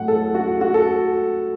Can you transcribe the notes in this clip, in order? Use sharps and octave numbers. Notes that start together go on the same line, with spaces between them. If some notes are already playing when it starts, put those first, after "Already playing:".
Already playing: A2 F#3 A3 F#5
A4
F#4
F#4
A4